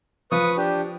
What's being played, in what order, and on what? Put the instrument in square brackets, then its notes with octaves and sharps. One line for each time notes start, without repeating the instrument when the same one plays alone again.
[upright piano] F3 [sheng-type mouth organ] B4 C#6 D#6
[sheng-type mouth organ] D4 G4